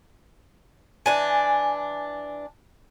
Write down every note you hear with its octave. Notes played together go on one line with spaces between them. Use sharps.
E3 D4 G#5